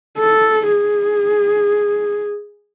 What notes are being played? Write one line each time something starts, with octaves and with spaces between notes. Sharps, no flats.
A4
G#4